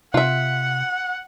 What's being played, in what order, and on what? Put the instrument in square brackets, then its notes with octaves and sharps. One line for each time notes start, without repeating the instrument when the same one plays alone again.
[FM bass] C3 [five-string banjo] F4 E5 [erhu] F#5